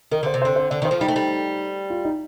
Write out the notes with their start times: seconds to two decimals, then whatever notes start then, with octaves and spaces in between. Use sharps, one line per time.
0.11 D#3 A#4
0.23 D3 C5
0.34 C3
0.42 D3 C5
0.56 C5
0.70 D3 D5
0.82 D#3 C5
0.91 F3
1.01 G3 D#4
1.08 A3
1.16 G3
1.90 F4
2.05 D#4